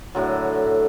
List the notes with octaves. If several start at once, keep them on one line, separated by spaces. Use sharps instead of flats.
A2 D3 F#3